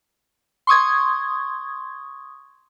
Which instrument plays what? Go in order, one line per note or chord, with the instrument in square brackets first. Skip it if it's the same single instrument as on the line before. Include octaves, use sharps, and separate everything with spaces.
[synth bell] C6 C#6 D#6 G#6